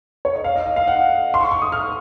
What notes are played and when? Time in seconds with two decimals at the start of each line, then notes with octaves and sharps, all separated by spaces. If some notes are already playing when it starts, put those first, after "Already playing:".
0.25 C#5
0.35 D#5
0.44 F5
0.56 D#5
0.66 D#5
0.76 F5
0.88 F#5
1.34 C6
1.41 C#6
1.51 C#6
1.62 D#6
1.72 F6